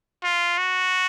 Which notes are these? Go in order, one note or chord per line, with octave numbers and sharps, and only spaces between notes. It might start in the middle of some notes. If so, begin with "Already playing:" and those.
F4
F#4